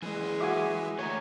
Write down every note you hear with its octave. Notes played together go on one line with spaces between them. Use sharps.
F#2 E3 G#3 G#4
F#4 E5 G#5 D6
D3 A3 C#5 G#5 A#5